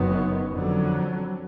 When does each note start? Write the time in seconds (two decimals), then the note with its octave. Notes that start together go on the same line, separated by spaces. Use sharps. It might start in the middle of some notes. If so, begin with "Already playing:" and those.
Already playing: F#1 F#2 D#3 F#3 B3
0.51 F2 D3 F#3